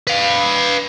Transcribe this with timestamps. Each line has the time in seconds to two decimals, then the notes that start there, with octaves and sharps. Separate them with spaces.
0.07 B4 F5